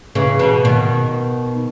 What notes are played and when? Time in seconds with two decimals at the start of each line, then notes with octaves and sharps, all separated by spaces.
0.15 C#3 E3
0.39 B2
0.65 B2 D#3